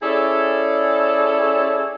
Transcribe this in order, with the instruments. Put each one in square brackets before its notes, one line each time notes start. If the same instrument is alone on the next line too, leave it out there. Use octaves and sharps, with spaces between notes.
[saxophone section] C#4 E4 G#4 A4 C#5 D5